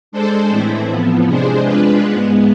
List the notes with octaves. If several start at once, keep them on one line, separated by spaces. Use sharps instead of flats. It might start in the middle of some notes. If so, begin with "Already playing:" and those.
G#3 D4 A4 C5
A2 E3 A3 C4 E4
A2 F3 B3
C3 G#3 D4 G#4 C5
G#3 D4 F4 B4
G#2 G#3 B3